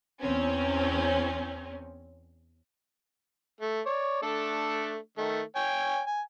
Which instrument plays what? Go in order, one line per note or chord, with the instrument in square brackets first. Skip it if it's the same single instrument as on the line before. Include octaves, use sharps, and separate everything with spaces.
[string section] E2 C4 C#4
[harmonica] A3
C#5 D5
A3 D4 A4
D#3 A3
C#5 G5 G#5
G#5